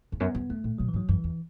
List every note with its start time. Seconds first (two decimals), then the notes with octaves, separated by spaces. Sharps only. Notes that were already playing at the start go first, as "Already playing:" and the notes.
0.12 E2
0.20 F#2 B3
0.35 F#2
0.50 E2 A3
0.64 A2
0.78 B2 F#3
0.89 E3
0.94 G#2
0.96 F#3
1.09 F#2 E3
1.24 E2